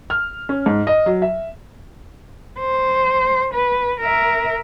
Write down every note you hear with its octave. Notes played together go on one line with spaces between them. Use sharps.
F6
C#4
G#2
D#5
F#3
E5
C5
B4
A#4 E5